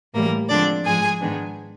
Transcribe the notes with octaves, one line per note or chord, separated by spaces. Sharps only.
A2 E3 G3 A#3 A#4
D3 F3 G#3 C4 D4 D5
G#2 F3 G#3 G#4 G#5
G#2 D#3 G#3 B3 D4